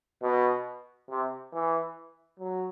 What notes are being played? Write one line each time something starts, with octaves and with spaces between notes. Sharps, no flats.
B2
C3
E3
F#3